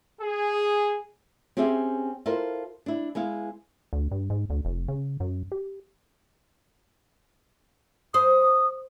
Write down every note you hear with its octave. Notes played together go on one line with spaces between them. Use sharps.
G#4
C4 C#4 G4 G#4 E5
E4 F4 A4 A#4 C5
D4 E4
G#3 B3 E4 F5
D2
G2
G#2
D2
F1
C#3
F#2
G4
C5 D#6